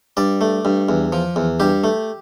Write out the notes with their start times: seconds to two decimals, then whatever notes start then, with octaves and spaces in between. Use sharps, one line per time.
0.17 G2 D5
0.41 A3
0.65 G2
0.89 E2
1.13 F3
1.36 E2
1.60 G2 G4
1.84 A3